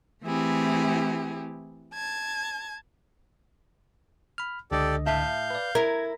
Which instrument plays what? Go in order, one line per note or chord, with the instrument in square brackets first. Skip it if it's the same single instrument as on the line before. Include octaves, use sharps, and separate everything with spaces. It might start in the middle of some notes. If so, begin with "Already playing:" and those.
[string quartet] E3 A3 C4 E4 G4 G#4
A5 G#6
[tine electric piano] B5 F6
[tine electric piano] C#2 D3 D#5 [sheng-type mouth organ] G4 A4 D5
[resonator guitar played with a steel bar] A2 E5 A5 [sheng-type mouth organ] F5 G6
[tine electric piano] B4 D5
[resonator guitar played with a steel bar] E4 [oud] A#4 [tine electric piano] G#6